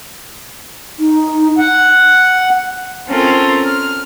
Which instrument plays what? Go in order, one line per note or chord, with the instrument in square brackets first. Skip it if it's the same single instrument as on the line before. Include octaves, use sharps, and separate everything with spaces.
[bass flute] D#4
[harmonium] F#5
[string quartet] C4 C#4 F4 A4 A#4
F6